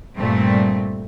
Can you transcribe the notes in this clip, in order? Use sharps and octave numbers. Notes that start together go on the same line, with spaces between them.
G2 A#2 G3 A3 C4